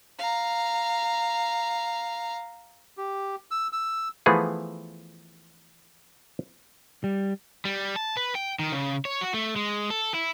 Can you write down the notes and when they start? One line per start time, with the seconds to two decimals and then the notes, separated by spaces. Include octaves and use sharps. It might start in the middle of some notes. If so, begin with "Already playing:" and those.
0.19 F5 A#5
2.97 G4
3.51 E6
3.73 E6
4.26 E3 F3 A3 B3 G#4
7.04 G3
7.65 G3
7.96 A5
8.17 B4
8.35 G5
8.59 D#3
8.72 C#3
9.05 C#5
9.21 F#4
9.34 A3
9.56 G#3
9.90 A4
10.14 E4